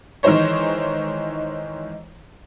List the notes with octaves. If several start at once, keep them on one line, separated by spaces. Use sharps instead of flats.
D#3 E3 G#3 D#4 C5 C#5